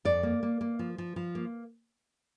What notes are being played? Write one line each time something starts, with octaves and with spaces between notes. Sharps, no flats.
F2 D5
A#3
A#3
A#3
F3
F3
F3
A#3